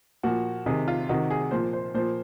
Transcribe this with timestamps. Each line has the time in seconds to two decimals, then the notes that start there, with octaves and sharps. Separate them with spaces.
0.23 A#2 F3 F#4
0.66 C3 D#3 G#4
0.88 F4
1.09 C3 D#3 F#4
1.30 G#4
1.51 A#2 F3 C5
1.73 C5
1.94 A#2 F3 C5